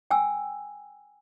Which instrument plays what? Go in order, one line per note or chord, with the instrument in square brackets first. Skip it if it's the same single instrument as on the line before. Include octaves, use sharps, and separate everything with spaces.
[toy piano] G5 G#5 E6